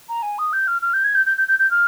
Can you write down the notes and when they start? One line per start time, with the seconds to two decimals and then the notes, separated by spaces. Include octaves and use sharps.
0.09 A#5
0.23 G#5
0.39 D#6
0.53 G6
0.68 F6
0.82 F6
0.94 G6
1.04 G#6
1.15 G6
1.26 G6
1.38 G6
1.48 G6
1.59 G6
1.71 F6